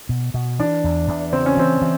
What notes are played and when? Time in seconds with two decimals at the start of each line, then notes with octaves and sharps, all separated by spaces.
0.09 B2
0.34 B2
0.59 E3 D4
0.84 E2
1.08 E2
1.33 C#3 C4
1.46 C#4
1.57 E3 C4
1.82 E3